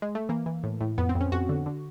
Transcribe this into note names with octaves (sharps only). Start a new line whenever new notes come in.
G#3
A3
E3 A#3
E3
A2
A2
F2 B3
C4
F2
C#4
F2 F#4
D3
D3